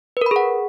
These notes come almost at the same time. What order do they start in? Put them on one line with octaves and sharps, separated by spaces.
B4 A#4 B5 G#4 F#5